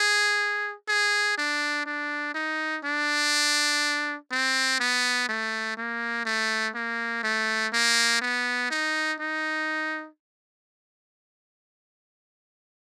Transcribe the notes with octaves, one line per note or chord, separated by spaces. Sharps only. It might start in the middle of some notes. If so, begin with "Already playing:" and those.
Already playing: G#4
G#4
D4
D4
D#4
D4
C4
B3
A3
A#3
A3
A#3
A3
A#3
B3
D#4
D#4